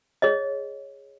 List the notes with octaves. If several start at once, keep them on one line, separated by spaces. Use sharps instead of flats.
G#4 C#5 D#5